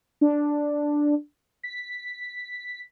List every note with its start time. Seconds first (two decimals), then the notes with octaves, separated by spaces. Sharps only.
0.21 D4
1.63 B6